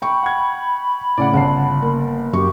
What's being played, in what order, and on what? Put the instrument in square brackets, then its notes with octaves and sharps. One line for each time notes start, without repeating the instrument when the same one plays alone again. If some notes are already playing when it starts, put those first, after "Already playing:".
[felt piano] G5 C#6 [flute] B5
[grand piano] F#5 G#6
[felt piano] A2 C#3 [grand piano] D5 F#5
[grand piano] G1 A5 C7 [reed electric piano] C#3 [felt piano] F#5
[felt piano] A#3
[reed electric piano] F#2 [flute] G4 [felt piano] C#6